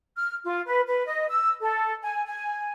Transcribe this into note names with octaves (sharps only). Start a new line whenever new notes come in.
F6
F4
B4
B4
D#5
E6
A4
G#5
G#5